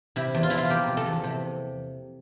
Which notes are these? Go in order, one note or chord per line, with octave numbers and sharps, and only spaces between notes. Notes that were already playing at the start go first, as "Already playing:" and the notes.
C3 E4
E2
F4
F3 E4
F4
A#3 G4
C3
A4
E2
C3